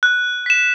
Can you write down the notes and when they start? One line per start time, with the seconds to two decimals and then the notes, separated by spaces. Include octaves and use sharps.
0.03 F#6
0.46 B6 E7